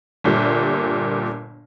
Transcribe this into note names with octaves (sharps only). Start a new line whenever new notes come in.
G1 A#2 G3